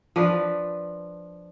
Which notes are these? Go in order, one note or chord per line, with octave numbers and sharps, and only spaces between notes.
F3 D4 B4